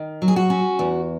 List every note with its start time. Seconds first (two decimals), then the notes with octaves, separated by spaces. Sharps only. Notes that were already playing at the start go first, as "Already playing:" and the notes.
Already playing: D#3
0.22 F#3
0.28 G#4
0.36 F#4
0.50 C#4
0.79 E2